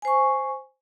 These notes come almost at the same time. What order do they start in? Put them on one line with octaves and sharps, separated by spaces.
G#5 C5 C#6